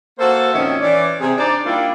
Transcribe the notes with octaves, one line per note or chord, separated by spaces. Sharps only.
A#3 F#4 A4 C5
F2 A#2 D#3 C#4 E5
E3 C#4 D5
C3 G#4
D4 D#4 C5 D5
D#3 G3 A#3 D4 E4 F4